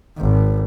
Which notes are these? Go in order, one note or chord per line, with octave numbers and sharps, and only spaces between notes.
G#1